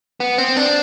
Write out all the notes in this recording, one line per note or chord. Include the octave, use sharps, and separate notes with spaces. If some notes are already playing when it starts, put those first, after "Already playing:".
B3
C4
D4